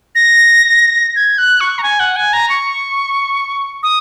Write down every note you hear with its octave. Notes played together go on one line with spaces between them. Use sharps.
A#6
G#6
F#6
C#6
A#5
G#5
F#5
G#5
A#5
C#6
D#6